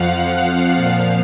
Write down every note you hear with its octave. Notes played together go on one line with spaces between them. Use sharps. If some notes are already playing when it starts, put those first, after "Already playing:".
Already playing: F2 F3 F5 F#5
F5
A#2 F3